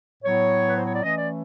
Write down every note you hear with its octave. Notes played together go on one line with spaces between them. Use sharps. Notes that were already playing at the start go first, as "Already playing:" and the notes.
A2 F#3 B3 C#5
B4
C5
C#5
D5
E3 A3 C#4 D#5
D5